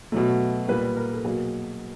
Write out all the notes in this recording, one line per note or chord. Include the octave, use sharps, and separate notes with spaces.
B2 F#3 A3
A#2 G3 A#3 B4
A#4
A4
B2 F#3 A#3 G#4